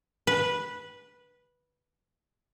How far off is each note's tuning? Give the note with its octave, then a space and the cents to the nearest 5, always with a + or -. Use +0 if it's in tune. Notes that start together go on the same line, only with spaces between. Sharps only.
B4 -10